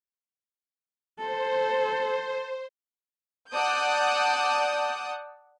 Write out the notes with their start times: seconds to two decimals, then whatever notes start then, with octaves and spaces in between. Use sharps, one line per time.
1.19 A4 C5
3.53 D5 F#5 A5 D#6 G6